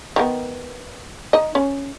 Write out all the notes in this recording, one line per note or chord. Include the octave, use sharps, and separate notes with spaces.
D#3 G#3 B3
D#4 D#5
C#4